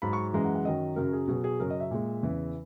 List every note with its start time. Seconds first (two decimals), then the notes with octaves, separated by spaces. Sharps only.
0.02 G#2 F#3 B5
0.13 C#6
0.33 F#2 E3 G#3 A#5
0.45 F#5
0.55 F#5
0.65 F#2 D#3 F#3 D#5
0.96 F#2 C#3 F#3 A#4
1.13 G#4
1.28 B2 F#3 G#4
1.44 G#4
1.60 F#2 C#3 F#3 A#4
1.70 D#5
1.80 E5
1.91 A#2 G#3
2.22 E2 C#3 E3